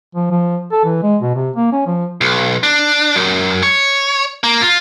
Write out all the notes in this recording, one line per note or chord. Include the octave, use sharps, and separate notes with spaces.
F3
F3
A4
E3
G#3
B2
C3
A#3
C#4
F3
B1
D4
F#2
C#5
A#3
F4